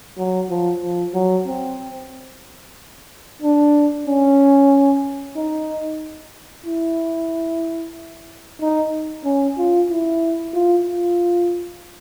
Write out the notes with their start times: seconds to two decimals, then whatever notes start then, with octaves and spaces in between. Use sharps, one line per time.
0.18 F#3
0.50 F3
0.82 F3
1.14 F#3
1.47 C4
3.42 D4
4.07 C#4
5.37 D#4
6.66 E4
8.61 D#4
9.25 C#4
9.58 F4
9.90 E4
10.55 F4
10.87 F4